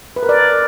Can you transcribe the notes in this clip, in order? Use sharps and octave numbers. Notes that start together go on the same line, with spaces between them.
B4
A#4
D5